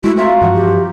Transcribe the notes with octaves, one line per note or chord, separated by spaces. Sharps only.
G#3 A3 E4 F#4
C4 F4 E5 A#5
G2 E3 F3 F#5
G4